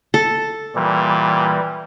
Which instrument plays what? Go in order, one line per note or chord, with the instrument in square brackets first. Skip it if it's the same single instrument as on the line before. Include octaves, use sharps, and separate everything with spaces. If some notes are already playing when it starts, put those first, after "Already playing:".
[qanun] A4
[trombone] A#2 [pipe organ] E3 G3